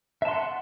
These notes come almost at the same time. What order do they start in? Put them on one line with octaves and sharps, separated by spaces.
E5 A5 C6 F#5